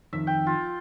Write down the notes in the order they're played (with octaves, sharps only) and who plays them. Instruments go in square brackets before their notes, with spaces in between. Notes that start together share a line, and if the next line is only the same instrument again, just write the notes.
[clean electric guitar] F2 D#3 [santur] E5
[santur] G5
F4